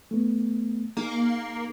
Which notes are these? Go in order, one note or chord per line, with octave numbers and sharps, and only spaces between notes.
A3 B3
A#3 D#4 G#4